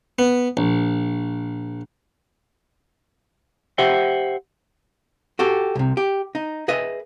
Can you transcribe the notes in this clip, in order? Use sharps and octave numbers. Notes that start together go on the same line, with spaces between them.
B3
A#1
G4 C5 E5 F#5 G5
F#4 G4 A4
C2 C3
G4
D#4
G#4 B4 D#5 E5